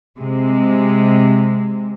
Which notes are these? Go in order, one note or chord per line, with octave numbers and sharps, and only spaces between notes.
C3 G#3